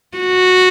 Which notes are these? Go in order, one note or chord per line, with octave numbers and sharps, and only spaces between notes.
F#4